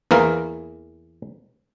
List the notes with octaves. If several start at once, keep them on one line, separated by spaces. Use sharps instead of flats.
E2 E3 A#3 A#4